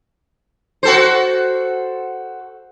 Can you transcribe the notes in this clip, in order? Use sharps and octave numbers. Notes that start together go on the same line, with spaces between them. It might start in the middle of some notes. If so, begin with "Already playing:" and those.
F#4 A4 C5